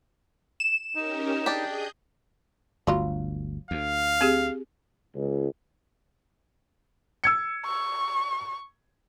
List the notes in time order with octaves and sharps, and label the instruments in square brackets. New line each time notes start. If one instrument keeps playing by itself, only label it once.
[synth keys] E7
[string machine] C#4 G4 A#4 [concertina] D#4
[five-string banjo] D4 G4 [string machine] G#4 D#5 G6
[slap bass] G1 D2 [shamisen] F#3 F4 B5
[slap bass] D2 [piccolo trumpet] F5
[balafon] C4 G4 G#4
[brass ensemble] C#2
[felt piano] E6 G#6 C#7
[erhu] C#6